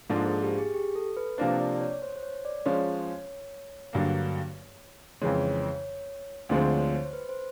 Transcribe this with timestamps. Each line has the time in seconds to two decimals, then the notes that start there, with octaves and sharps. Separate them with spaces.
0.10 G#2 F3 A#3 D4 F4 A4
0.26 G#4
0.42 G4
0.58 G#4
0.74 G4
0.96 A4
1.17 B4
1.38 C3 F3 A#3 D4 C5
1.59 D5
1.81 C#5
2.02 C5
2.16 C5
2.23 C#5
2.45 D5
2.66 F3 G#3 C#4 C#5
3.93 G2 D3 F#3 A#3
5.21 F2 C#3 E3 G#3 C#5
6.49 D2 D3 F3 G#3 C4 D5
6.70 C#5
6.92 C5
7.13 B4
7.29 C5